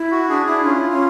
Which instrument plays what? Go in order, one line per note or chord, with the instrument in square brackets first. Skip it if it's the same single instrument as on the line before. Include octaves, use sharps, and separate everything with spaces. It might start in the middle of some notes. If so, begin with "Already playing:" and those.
Already playing: [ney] E4
[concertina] F#4
[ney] D4 [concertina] G#4
[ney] D4 [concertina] E4
[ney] C#4 [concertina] F4
[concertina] F4
[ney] C#4